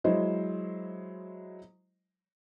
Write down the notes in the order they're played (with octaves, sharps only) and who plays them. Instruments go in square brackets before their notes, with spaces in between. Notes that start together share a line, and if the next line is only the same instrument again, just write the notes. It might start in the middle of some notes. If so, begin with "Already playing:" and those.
[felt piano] F#3 G#3 E4 C5 D#5